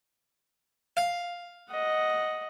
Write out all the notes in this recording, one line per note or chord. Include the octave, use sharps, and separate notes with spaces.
F5
D#5 F#5